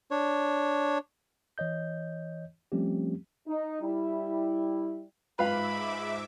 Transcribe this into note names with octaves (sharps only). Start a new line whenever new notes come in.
D4 C#5
E3 C#5 D#5 G6
F3 G3 A3 C4 C#4 G4
D#4
G3 E4
G#2 G#3 F4 B4 E5 F5 B5 D6